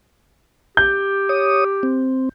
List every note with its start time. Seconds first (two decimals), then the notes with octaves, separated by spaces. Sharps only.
0.77 G4 G6
1.29 C#5 D#6
1.83 C4